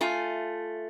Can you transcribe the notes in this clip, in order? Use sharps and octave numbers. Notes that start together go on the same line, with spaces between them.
A3 F4 G#5